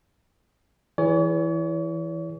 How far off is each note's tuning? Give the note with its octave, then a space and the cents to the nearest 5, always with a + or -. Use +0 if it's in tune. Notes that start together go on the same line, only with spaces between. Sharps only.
E3 +5 G#4 +0 C#5 +40